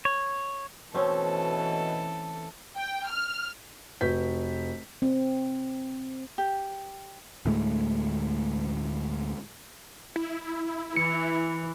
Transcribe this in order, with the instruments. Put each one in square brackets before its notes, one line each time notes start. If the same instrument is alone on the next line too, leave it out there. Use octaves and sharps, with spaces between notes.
[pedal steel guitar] C#5
[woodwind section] B2 [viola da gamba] E3 A4 [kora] A3 C4 C#4
[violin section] G5
F6
[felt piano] F1 F#4 B4 G6 B6
[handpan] C4
[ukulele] G4
[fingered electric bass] D2 A2 G#3 A3
[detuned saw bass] E4
[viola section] E3 [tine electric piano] C#7